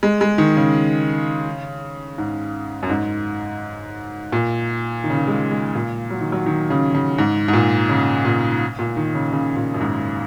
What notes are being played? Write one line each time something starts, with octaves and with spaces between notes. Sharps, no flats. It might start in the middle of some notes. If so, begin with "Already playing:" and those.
G#3
G#3
D#3
C#3
G#2
F#2
G#2
A#2
D#3
C#3
D#3
G#3
G#3
A#2
F#3
D#3
F#3
D#3
C#3
C#3
G#2
G#2
A#2
C#3
A#2
A#2
D#3
C#3
C#3
A#2
F#2
G#2